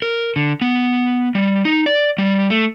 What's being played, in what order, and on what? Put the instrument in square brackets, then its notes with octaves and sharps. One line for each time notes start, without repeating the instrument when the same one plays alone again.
[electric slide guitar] A#4
D3
B3
G3
D#4
D5
G3
A3